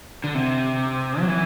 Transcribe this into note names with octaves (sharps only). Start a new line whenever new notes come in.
D3
C3
F#3
E3